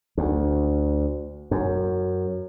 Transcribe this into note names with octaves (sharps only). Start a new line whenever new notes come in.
D2
F#2